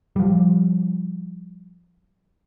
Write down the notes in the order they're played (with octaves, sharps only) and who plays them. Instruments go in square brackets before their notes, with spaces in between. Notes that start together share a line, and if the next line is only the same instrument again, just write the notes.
[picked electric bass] F3 G3